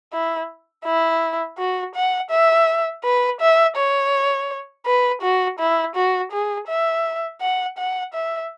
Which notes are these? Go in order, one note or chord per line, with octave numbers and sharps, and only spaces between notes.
E4
E4
F#4
F#5
E5
B4
E5
C#5
B4
F#4
E4
F#4
G#4
E5
F#5
F#5
E5